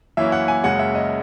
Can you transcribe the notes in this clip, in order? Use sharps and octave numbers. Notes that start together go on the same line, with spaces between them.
F#2 E3 A#3 C#4 E4 E5
F#5
G#5
F#1 F#2 C#3 G#3 F#5
E5
D#5